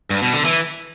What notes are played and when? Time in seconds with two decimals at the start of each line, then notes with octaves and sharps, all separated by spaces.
0.10 G2
0.22 B2
0.34 D3
0.45 E3